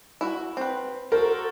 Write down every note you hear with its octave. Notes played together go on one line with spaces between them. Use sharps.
E4 F#4
C4 B4
F#4 A4 A#4 C5